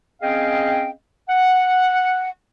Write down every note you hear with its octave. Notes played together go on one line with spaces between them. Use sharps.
C4 C#4 G#4 D#5 F5 G5
F#5